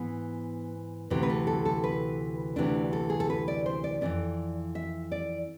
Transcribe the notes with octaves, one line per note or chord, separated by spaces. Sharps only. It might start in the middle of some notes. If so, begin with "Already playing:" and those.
Already playing: G#2 E3 B3
D2 C3 E3 C4
B4
A4
A4
A4
B4
D2 C3 E3 D4
A4
G#4
A4
B4
D5
C5
D5
F2 C3 E3 D5
E5
D5